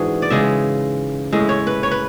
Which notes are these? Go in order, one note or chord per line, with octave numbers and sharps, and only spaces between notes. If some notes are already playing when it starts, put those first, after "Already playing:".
Already playing: G#2 E3 D4 F#4 G#4
D5
C#3 G#3 E5
A2 G#3 E5
C#5
B4
C#5
B4